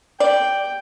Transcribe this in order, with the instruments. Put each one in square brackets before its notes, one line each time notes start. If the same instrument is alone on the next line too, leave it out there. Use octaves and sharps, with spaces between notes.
[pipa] D5 [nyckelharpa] G5